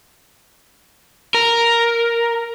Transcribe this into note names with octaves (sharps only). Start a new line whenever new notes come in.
A#4